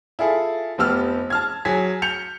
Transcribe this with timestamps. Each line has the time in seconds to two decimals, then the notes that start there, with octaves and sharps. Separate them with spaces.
0.19 E4 F4 G#4 A4
0.78 F1 B3 G4 E6 F6
1.30 A5 F6 G#6
1.65 F#3 G#4 G#6 B6
2.02 G6 C#7 F7